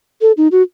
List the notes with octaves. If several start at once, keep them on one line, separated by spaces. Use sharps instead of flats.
A4
D#4
F#4